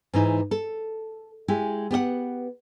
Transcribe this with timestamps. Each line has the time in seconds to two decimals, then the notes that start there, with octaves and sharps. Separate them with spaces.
0.13 G#2 E3 D#4
0.51 A4
1.48 G#3 E4 G4
1.91 B3 G4 D5 F#5